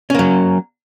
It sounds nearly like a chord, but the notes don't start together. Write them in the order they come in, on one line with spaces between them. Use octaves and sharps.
C#4 A#3 F#3